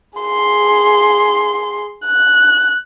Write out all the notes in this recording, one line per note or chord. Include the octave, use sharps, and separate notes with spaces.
G#4 C6
F#6